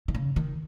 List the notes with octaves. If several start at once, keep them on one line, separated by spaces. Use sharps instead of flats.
D#3
C#3
D#3